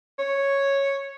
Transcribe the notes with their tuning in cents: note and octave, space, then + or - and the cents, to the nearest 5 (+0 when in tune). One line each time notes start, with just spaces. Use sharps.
C#5 -5